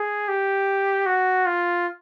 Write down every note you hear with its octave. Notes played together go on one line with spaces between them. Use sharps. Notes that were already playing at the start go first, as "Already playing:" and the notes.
Already playing: G#4
G4
F#4
F4